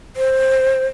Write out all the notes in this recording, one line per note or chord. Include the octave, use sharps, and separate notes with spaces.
C5